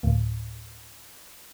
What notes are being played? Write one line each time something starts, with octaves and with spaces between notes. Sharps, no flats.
D2 A2